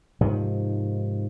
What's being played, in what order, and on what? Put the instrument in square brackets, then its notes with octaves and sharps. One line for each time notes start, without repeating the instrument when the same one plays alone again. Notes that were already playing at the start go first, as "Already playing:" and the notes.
[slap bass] G#2 C3 D#3 F3